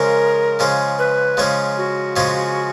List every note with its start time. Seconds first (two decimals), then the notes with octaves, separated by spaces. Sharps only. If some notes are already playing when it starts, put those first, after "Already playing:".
Already playing: C#3 F3 G#3 C#4 G#4 A#4
0.59 C#3 F3 G#3 C#4 G#4
0.99 B4
1.37 C#3 F3 G#3 C#4 G#4
1.77 F#4
2.16 C#3 F3 G#3 C#4 G#4